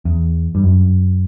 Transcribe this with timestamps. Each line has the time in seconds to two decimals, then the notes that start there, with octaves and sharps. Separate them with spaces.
0.05 E2
0.55 G2
0.63 F#2